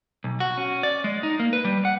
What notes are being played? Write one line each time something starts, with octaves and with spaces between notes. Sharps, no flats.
B1
F#4
C#4
D5
G#3
D#4
A#3
B4
G3
F#5